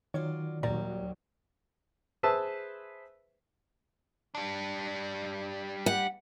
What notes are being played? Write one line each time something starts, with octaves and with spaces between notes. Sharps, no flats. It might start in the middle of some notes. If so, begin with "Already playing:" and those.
D#3 F#3 F4 C#5 D5
D#2 A#2 F#3 G3 D5 A#5
G#4 B4 C5 E5 A5 E6
G3 D4
F#5